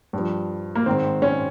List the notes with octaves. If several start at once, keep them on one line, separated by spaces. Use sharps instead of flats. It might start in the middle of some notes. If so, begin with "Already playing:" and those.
G2
F3
A#3
G#2 D#3 C4
C#4